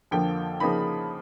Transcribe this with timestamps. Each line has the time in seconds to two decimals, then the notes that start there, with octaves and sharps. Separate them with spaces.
0.11 F2 D3 F3 A#3 G5
0.60 C#3 F3 A#3 D#4 B5